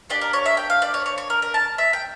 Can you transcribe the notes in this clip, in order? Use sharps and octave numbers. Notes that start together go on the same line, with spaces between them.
A#3 D4 G4 D5
A#4
C#5
E5
G5
F5
D5
C#5
C#5
C#5
A#4
A#4
A5
E5
G5